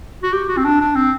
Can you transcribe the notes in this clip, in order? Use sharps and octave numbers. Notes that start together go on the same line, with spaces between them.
F#4
G4
F#4
C4
D4
D4
C4